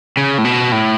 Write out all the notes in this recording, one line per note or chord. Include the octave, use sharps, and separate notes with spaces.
C#3
A2
B2
A2